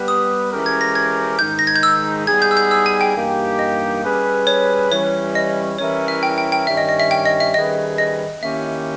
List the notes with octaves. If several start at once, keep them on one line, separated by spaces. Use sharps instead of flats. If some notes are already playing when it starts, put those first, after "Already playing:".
Already playing: G3 B3 G4 B4
D#6
E3 G#3 C#4 G4 A#4
G#6
A#6
G#6
G#2 D#3 G#3 D#4 G6
A#6
G#6
G6
E6
G3 B3 D#4 G#4 G#6
G6
E6
G6
E6
G#5
G5
G2 E3 A#3 D#4 G4
D#5
G3 C#4 G#4 B4
C#5
E3 G3 C#4 C#5
D#5
E3 G3 C#4 E4 A#4 C#5
E5
G5
G5
G5
G2 D#3 G3 C#4 E5
D#5
D#5
E5
G5
D#5
E5
D#3 G3 C#4 G#4 B4 D#5
D#5
D#3 A#3 C#4 E4 G4 E5